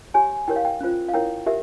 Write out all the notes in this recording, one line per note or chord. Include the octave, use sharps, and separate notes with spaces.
G4 C#5 G#5
E4 G4 A#4 C#5 G5
F5
G5
C#4 F4 C5
F5
E4 A#4 C#5 G5
G4 A#4 E5